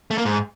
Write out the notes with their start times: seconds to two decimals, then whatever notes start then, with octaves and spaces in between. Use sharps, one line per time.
0.11 A3
0.18 A#3
0.25 G#2